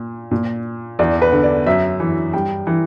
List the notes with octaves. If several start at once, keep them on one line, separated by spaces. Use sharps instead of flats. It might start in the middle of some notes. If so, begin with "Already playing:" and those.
Already playing: A#2
A#2
E2 D5
B4
D3
D5
F#2 E5
E3
G2 G5
E3